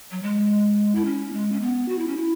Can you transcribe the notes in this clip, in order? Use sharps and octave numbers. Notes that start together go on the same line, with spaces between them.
F#3
G#3
E4
C#4
G#3
C#4
B3
F#4
E4
C#4
E4